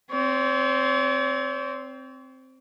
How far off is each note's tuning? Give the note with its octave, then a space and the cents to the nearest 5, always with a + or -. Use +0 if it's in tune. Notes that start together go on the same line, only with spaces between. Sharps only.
C4 +0 C#5 +45